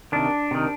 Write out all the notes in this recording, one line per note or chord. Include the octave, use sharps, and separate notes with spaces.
C3 D#3 D4
C3 D#3